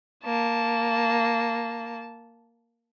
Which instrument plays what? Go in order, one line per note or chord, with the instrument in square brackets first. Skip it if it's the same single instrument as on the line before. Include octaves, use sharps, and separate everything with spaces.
[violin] A#3 A5